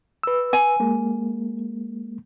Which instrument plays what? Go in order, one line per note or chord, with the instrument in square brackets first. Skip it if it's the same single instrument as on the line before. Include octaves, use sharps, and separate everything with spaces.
[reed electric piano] B4 E6
[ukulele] G#5
[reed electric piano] G#3 A#3